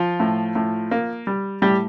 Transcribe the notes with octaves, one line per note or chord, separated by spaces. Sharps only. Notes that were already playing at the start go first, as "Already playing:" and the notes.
Already playing: F3 F4
A2
A2
A#3
G3
A2 G3 G4